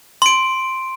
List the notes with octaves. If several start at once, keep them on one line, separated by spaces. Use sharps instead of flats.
C6 D7